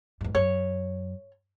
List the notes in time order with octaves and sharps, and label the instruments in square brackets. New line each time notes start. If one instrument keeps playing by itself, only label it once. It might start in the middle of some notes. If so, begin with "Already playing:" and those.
[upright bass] E2 G#2
[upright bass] F#2 [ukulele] C#5